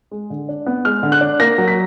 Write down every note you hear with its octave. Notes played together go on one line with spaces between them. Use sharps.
G#3
D3
D4
B3
G#3 F6
D3
F#6
D4
A#3 A#6
F#3
B6